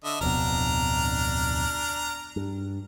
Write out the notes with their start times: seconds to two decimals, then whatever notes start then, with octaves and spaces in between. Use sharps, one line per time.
0.04 D3 D#5 E5
0.21 D1 F2 B2 D4 A#5 F6
2.36 G2